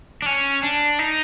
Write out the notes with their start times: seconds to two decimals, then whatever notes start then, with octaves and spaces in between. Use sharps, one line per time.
0.22 D4
0.26 C#4
0.63 D4
0.99 D#4